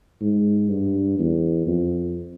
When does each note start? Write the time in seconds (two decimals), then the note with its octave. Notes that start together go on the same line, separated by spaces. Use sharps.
0.21 G#2
0.69 G2
1.19 E2
1.67 F2